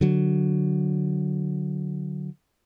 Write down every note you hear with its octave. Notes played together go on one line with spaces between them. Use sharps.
D3 F#3